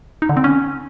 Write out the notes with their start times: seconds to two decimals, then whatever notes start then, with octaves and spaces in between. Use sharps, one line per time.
0.22 D#4
0.29 D3
0.37 C4
0.44 C#4